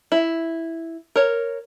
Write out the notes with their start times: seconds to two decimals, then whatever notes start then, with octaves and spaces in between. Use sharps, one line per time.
0.12 E4
1.16 A#4 C#5